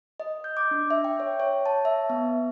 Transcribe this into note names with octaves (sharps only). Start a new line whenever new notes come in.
D#5
G6
D6
D4
E5
G5
C#5
C#5
A5
E5
B3